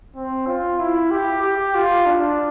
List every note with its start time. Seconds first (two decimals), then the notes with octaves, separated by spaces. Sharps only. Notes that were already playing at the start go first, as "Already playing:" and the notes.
0.16 C4
0.47 F4
0.79 E4
1.11 G4
1.42 G4
1.75 F4
2.06 D4